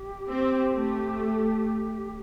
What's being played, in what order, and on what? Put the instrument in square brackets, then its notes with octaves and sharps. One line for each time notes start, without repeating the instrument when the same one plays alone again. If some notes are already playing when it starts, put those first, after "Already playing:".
Already playing: [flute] G4
[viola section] C4
A3